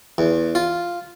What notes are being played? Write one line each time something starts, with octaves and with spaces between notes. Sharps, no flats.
E2
F4